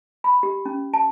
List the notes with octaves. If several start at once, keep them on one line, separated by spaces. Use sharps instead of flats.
B5
G4
C#4
A5